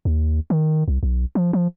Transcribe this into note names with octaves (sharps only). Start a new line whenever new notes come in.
D#2
D#3
C2
B1
F3
F3